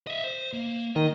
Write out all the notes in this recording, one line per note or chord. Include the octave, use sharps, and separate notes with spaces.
D#5 E5
C5
A#3
D#3 D#5